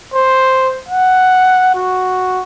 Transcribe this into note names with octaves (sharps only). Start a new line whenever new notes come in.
C5
F#5
F#4